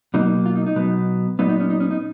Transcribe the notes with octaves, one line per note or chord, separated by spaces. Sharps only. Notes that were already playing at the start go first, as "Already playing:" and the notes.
B2 F#3 A#3 D#4
F4
D#4
D#4
B2 F#3 B3
A#2 F#3 B3 D#4
D#4
C#4
D#4
C#4
D#4